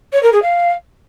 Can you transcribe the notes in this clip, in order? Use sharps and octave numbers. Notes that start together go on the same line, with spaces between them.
C#5
A#4
G#4
F5